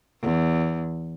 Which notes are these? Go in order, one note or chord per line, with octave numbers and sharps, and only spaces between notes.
E2